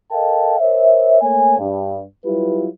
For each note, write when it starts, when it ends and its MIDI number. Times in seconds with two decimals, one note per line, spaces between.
0.12 0.55 69
0.12 0.55 70
0.12 0.55 75
0.12 0.55 77
0.12 0.55 79
0.12 0.55 81
0.59 1.19 70
0.59 1.19 72
0.59 1.19 73
0.59 1.19 76
1.22 1.57 57
1.22 1.57 58
1.22 1.57 73
1.22 1.57 80
1.58 2.03 43
2.25 2.67 54
2.25 2.67 55
2.25 2.67 64
2.25 2.67 65
2.25 2.67 67
2.25 2.67 71